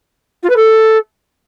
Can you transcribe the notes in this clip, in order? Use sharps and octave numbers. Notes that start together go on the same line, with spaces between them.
F4
B4
A4